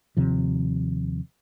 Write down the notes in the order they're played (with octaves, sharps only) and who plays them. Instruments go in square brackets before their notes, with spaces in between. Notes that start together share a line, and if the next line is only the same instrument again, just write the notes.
[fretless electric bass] D#2 C3 F3